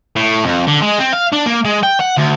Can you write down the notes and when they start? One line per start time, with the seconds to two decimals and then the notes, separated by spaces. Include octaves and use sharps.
0.16 A2
0.44 F2
0.67 D3
0.82 G#3
0.99 C4
1.13 F5
1.32 D4
1.46 A#3
1.65 G#3
1.83 G5
2.00 F#5
2.17 D2